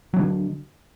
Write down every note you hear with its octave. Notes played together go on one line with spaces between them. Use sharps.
D3 F#3 D4